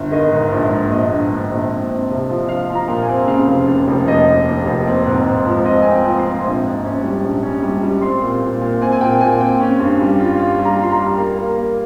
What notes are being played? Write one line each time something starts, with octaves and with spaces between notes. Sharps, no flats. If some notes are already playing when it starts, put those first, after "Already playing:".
Already playing: G1
D#3 D#5
G#2
A#1
G#2
A#1 D#5
A#1
G#2
A#1
C4
C4
C2
F3
F3 F5
F3
A#5
A#2
G#5
C4
C#3 F5
F1
D#2
F1
F1 D#5
F1
D#2
F1
C4
G#2
G#2
F3
C4 D#5
C4 G#5
G5
F3
C6
C4
A#1
G#2
C#4
G3
A#1
C#4
G3
G3
C4 C6
A#2
A#2
A#2
C4 G#5
G#5
A#2 G5
A#2 G#5
C4 G5
C#4
G2
G3
F4
F4
G3
A#5
F4 C6
A#5
G3
A#3
A#3
A#3